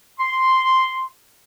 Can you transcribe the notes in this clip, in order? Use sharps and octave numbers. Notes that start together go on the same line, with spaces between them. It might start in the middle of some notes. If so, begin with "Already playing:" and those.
C6